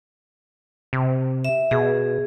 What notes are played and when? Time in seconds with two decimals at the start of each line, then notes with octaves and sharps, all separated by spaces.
0.93 C3
1.45 E5
1.71 B2 G#4